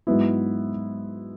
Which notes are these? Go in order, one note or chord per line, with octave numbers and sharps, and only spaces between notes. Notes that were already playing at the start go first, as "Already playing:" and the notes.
G#2 F#3 B3 E4